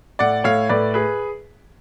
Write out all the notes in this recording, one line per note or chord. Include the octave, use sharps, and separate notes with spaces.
A2 D5 F#5
A2 C#5 F5
A2 B4 D5
G#4 B4